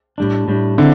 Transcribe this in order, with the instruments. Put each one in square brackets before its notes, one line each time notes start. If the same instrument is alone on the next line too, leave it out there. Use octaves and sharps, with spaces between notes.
[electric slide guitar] A2 G3 D4
A2 G3 D4
[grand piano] D3 [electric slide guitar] C4 E4